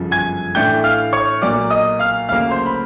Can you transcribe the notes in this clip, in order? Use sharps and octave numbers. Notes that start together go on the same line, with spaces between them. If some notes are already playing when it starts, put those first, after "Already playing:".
Already playing: G1 F#2 C#3 F3
G#5 G#6
A2 E3 A3 D4 G5 G6
F5 F6
C#5 C#6
B1 A#2 F#3 A#3 D5 D6
D#5 D#6
F5 F6
D2 C#3 F#3 A#3 F5 F6
C5 C6
B5